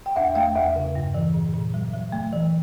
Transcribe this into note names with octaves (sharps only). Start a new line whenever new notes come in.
G5
E2 E5 F#5
A3 F5 G5
E2 E5 F#5
C#3
G2
E3
A#2
A#2
F#3
F#3
A3
E3